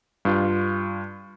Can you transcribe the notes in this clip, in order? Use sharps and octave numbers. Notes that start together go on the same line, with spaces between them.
G2 F4